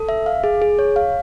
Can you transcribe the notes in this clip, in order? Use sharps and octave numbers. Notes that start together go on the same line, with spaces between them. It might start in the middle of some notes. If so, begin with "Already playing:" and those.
Already playing: A4
E5
F5
G#4
G#4
C#5
F5